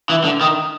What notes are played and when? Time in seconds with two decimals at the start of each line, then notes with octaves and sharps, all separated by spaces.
0.10 E3
0.24 D3
0.41 D#3